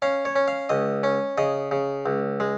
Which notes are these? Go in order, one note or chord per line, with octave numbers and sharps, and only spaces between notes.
C#4 F5
C#5
C#4
F5
C#2 D#5
C#4
C#3 D#5
C#3
C#2
G#3